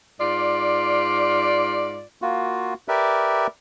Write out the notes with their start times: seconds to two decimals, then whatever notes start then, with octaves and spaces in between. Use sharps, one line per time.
0.20 G#2 F4 D5
2.22 A#3 F4 F#4
2.88 G4 A#4 B4 D5 E5